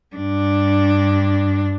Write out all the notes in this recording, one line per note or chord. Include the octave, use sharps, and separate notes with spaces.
G2 D4